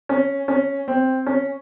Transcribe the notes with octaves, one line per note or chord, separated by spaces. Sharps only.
C#4
C#4
C4
C#4